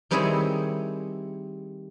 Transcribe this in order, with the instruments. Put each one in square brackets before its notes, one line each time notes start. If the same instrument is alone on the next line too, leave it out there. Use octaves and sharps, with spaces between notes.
[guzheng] D#3 G3 C4 E4 G#4 C#5